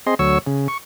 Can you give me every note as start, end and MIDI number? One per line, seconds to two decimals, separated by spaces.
0.07 0.15 60
0.07 0.15 68
0.07 0.15 75
0.07 0.15 84
0.19 0.38 38
0.19 0.38 54
0.19 0.38 73
0.19 0.38 85
0.19 0.38 88
0.47 0.68 49
0.68 0.78 85